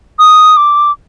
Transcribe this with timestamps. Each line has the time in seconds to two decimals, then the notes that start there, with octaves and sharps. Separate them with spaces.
0.19 D#6
0.57 D6